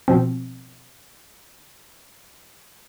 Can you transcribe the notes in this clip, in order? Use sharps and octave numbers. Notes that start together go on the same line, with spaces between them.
B2 F3 C4